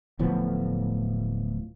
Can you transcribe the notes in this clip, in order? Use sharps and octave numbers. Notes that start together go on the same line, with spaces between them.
D1 A2 F3 B3